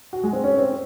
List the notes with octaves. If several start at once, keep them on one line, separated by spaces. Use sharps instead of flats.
F#4
G#3
C4
C#4
C4